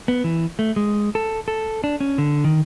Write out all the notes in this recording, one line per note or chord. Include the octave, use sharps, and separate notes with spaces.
B3
E3
A3
G#3
A4
A4
D4
C#4
D3
D#3